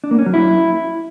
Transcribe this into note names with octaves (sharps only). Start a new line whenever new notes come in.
D4
A#3
C#4
F#3
E4